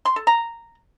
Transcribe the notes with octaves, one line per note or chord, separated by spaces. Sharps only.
C6
A4
A#5